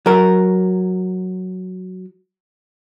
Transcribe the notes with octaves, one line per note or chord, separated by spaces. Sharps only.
F#3 A#4